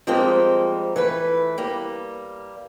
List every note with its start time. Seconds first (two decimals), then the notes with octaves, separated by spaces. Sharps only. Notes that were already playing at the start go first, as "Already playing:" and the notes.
0.07 F3 G3 G#3 A#3 C4 A#4
0.96 E3 A3 B4
1.58 G3 A#3